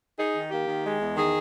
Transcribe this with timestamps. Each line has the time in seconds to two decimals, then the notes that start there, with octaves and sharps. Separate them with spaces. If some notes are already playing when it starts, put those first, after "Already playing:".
0.18 D#4 G#4
0.34 D#3
0.51 A#3 G4
0.67 D#3
0.84 G#3
1.00 E2
1.17 D#3 G#4